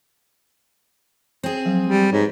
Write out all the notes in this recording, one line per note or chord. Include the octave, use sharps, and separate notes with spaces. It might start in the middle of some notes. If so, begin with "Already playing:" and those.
C4 G#4
F3 F#3
G3 G#3
G#2 B4 C#5